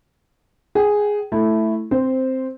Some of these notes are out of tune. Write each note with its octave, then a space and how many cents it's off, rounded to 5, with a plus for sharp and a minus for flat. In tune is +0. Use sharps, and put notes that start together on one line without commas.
G#4 +0 G5 -30
A3 +0 E4 +0
C4 +0 C5 -5